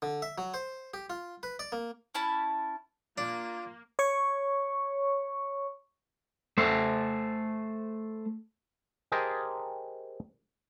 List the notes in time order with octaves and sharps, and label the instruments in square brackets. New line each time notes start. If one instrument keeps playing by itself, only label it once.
[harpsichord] D3
E5
F#3
C5
G4
F4
B4
D5
A#3
[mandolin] C#4 E4 A5 B5
[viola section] A#3 [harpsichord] D4 [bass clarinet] F4
[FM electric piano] C#5 C#6
[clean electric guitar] A3 C5
[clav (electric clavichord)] G4 G#4 A#4 C5 D#5 A5